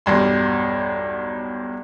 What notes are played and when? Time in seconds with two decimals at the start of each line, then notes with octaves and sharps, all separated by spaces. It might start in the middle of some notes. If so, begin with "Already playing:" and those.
0.06 B1 E2 G2 C6